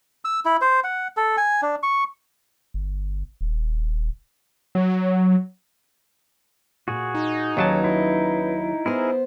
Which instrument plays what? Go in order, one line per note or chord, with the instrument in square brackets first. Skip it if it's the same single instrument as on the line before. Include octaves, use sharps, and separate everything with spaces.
[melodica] E6
E4
C5
F#5
A4
G#5
D4
C#6
[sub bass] G1
D#1
[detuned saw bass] F#3
[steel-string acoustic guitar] A#2 [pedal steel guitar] F#4 G#4
[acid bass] D#4
[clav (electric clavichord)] D#2 F#3 A5 [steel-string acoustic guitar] C#4 B4
[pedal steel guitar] E4
[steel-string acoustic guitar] B3 C5 [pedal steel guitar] E4 G#4 A#4